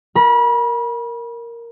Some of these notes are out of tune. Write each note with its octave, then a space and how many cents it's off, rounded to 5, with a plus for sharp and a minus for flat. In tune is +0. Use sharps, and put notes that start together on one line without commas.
A#4 +0 B5 -35